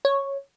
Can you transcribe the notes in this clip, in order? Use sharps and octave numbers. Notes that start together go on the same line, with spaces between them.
C#5